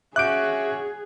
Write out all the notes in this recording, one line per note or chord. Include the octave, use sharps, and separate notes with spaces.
C#4 F#4 G#4 E5 D6 F#6 G6 D7